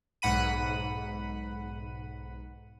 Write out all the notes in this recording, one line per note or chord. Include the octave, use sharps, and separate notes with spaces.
B1 G#2 F#5 B5 D#7